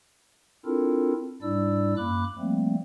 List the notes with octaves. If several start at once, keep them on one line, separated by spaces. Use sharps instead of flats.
C4 D4 E4 F4 A4 A#4
G#2 G3 D4 E4 D5 E6
F#2 A#3 B5 D6 F#6
F3 G3 A3 A#3 C4